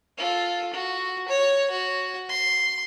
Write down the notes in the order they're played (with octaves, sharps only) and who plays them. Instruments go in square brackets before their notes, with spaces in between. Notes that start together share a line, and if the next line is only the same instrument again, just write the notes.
[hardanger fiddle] F4 A4
F#4
C#5
F#4
C6